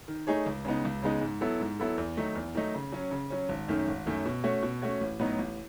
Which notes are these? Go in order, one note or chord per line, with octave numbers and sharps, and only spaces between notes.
D#3
A3 D#4 G#4 C#5
C#2
C#3 G#3 B3 D#4
C#2
C#3 G#3 B3 D#4
G#2
F#3 B3 E4 A4
G#2
F#3 B3 E4 A4
E2
D#3 F#3 A3 D#4
E2
D#3 F#3 A3 D#4
C#3
F#3 C#4
C#3
F#3 C#4
G#1
F#2 D#3 A3 C#4
G#1
F#2 D#3 A3 C#4
B2
A3 C#4 F#4 C#5
B2
A3 C#4 F#4 C#5
A1
A2 F#3 B3 D#4
A1